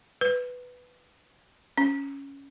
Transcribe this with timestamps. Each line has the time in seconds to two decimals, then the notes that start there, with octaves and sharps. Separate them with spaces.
0.21 B4
1.78 C#4